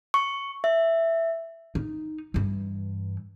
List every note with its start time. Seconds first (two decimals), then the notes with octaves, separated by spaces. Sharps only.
0.14 C#6
0.64 E5
1.75 D#4
2.34 G2 E3